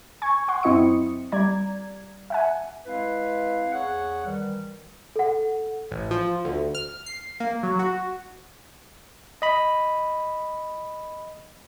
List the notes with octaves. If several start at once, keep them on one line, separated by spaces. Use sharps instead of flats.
G#5 C#6 G#6
F#5 C6 C#6
F#2 C4 E4 D#5 D#6 C#7
G3 D5 A#5 G#6
E5 F#5 G#5
G#3 C4 E4 B4 F5
E2 G#4 C#5 F#5
D#3 E3 G3
A4 F#5
A1
F3
D2
F6
C7
A#3
F#3
F#4
D#5 B5